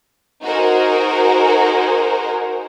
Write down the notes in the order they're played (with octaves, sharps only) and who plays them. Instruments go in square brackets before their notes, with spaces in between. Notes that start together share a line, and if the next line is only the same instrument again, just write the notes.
[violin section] D#4 F#4 G#4 A#4 C5